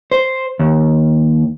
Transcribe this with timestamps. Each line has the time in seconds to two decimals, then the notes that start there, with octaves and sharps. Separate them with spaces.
0.11 C5
0.59 D#2